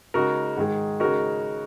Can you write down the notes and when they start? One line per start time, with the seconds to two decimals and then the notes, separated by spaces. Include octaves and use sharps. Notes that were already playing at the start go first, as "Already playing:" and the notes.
0.14 C#3 G#3 D#4 F#4 A#4
0.57 G#2 D#3 G#3
1.00 C#3 G#3 D#4 F#4 A#4